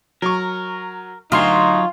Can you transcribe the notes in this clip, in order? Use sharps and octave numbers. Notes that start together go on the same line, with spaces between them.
F#3 A#4 C#6
D2 F#3 D#4 F4 C#5 C6 C7